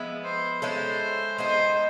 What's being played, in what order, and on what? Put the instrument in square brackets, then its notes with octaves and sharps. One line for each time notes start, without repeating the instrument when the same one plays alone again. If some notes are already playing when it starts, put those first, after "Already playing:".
Already playing: [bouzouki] F3 G#3 B3 E4
[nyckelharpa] C5
[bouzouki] G#3 C#4 E4 A4 [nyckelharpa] C5
[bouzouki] G#3 B3 D#4 [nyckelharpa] C5